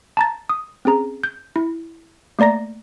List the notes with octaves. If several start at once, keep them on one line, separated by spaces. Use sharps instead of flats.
A5 A#5 A6
D#6
C4 C#4 G#4 A#5
G6
E4
A3 A#3 D5 A#5 A#6